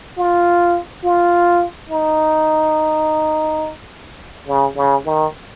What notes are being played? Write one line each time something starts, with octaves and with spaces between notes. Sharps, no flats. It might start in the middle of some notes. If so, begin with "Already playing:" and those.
F4
F4
D#4
C#3
C#3
D#3